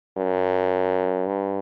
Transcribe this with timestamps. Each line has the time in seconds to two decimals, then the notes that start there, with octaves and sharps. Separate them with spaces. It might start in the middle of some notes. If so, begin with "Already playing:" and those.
0.18 F#2
1.27 G2